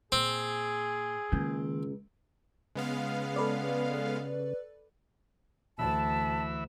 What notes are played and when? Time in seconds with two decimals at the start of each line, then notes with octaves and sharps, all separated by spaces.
0.12 A#2 C4 G#4
1.32 C#2 D#3 A#3
2.75 C#3 G#3 B3 F5
3.36 A4 B4 D5
5.79 D2 E3 E5 A5 B5